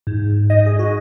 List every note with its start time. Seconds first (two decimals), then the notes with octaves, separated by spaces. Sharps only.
0.07 G#2
0.50 G#2 D#5
0.66 G#4
0.79 F#4